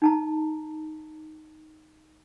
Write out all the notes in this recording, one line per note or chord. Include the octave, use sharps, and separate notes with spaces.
D#4 A5 A#5